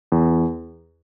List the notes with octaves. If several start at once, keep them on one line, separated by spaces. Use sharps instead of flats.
E2